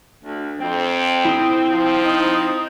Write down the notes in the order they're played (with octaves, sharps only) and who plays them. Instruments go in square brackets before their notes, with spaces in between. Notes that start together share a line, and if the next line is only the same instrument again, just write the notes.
[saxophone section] D2
[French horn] F2 [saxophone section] C4
[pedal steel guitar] E4 D#6
[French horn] F3
[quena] D#4